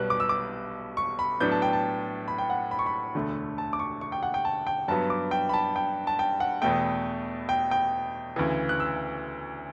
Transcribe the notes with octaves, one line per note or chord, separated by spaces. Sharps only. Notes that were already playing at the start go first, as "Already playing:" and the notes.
Already playing: B1 B2 G3 B3 F#6
D6
E6
D6
C#6
B5
A2 F#3 B3 D4 G6
A5
G5
A5
B5
G5
F#5
B5
C#6
B5
E1 D2 D3 A3
A5
D6
C#6
C#6
G5
F#5
G5
A5
G5
G2 F#3 B3 A5
D6
G5
B5
A5
G5
A5
G5
F#5
E2 B2 A3 G5
G5
G5
D2 C#3 E3
F#6
E6